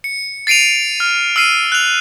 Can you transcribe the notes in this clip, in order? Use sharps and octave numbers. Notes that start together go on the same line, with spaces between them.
C#7
A6 C7 D7 D#7 F7
F6
E6 F6 C7 D#7
F#6 F7